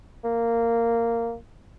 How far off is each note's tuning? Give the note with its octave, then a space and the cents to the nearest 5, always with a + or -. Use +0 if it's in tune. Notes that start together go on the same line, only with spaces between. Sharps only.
A#3 -10